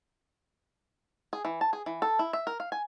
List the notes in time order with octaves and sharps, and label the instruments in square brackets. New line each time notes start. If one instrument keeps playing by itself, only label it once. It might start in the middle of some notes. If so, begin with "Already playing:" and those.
[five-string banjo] G#4
E3
A5
G#4
E3
A4
E4
E5
A#4
F5
G#5